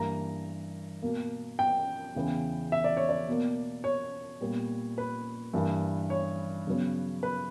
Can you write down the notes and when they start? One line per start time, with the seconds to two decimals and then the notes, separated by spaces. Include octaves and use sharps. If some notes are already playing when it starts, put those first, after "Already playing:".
Already playing: G2 E3 A#3 A#5
1.02 B2 A#3
1.59 G5
2.15 E2 C#3 E3 B3
2.72 E5
2.84 D5
2.97 C#5
3.09 D5
3.27 B2 A#3
3.84 C#5
4.41 A#2 G3 B3
4.98 B4
5.53 G2 E3 A#3
6.10 C#5
6.67 C#3 F#3 B3
7.23 B4